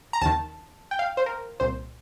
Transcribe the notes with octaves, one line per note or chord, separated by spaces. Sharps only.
A#5
D#2 D#3 A5
G5
F5
C5
A#4
C2 A#2 C5